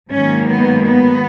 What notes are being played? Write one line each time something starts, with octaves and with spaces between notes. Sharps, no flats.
G#2 D#3 F#3 A#3 C#4
B3
B3